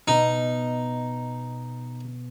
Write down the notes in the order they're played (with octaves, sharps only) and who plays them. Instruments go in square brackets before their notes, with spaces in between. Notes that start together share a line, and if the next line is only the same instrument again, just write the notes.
[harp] B2 [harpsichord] D#4